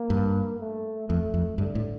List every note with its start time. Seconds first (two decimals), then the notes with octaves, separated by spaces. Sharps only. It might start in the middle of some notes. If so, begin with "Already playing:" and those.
Already playing: A#3
0.10 G2
0.60 A3
1.09 F2 A3
1.34 F2
1.58 G2 D3
1.75 A2